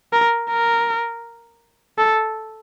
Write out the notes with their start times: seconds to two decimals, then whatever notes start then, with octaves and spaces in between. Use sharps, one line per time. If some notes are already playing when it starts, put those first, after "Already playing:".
0.13 A#4
0.50 A#4
1.98 A4